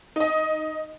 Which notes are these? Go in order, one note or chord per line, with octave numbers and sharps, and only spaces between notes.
D#4 D#5